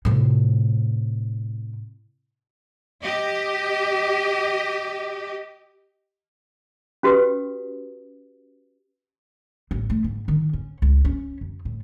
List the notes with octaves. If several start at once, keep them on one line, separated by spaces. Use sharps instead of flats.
A2 C3
G4 D#5
C#4 F#4 G4 B4 D#6
A1
A3
G#2
D#3
C#4
C#2
C#4
F#2
A2